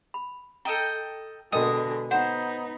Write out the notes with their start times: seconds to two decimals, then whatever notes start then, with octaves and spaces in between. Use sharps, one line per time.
0.14 B5
0.65 A4 D#5 G5 A#5
1.52 B2 D3 G#3 A#4 D#5 G5 D#6
2.11 B3 D#4 C5 F#5